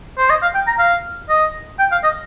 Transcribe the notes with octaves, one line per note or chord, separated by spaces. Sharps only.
C5
D#5
F5
G5
A#5
F5
D#5
G5
F5
D#5